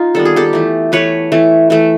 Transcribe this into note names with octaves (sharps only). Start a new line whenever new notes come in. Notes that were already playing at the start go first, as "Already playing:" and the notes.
Already playing: D#4 F4
D#3 G3 B3 A4
G#4
G4 A4
E3 A3
E3 A3 B4 C#5
E3 A3
E3 A3